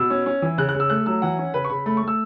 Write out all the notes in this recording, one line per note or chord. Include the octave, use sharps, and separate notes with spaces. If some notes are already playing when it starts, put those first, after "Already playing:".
Already playing: B2 E6
C#4
C#4
E3
C#3 F#6
F#6
C#3
E6
A3 F#6
F#3 E6
E3 F#5
C#4
C#3 B4
C#6
C#3 B5
A3 B5
C#6
A3
E6